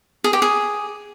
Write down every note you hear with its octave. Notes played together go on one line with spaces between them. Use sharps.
G#4
G4
G#4